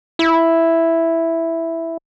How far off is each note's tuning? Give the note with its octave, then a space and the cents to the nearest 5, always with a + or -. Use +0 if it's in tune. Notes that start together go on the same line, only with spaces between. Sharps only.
E4 +0